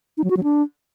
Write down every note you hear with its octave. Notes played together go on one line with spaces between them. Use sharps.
D#4
F#3
F#4
F#3
D4